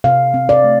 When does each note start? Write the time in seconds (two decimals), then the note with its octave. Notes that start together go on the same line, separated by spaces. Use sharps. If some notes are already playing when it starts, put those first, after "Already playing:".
0.04 C3 F5
0.34 C4
0.49 D5
0.64 A3